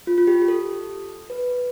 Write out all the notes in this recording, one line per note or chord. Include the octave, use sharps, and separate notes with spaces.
F4
F4
G4
G4
A4
B4